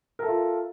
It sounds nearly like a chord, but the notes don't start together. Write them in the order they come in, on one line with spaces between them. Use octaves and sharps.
A#4 A4 E5 F4